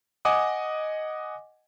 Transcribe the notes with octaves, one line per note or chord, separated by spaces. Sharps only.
D#5 F#5 G#5 D6 D#6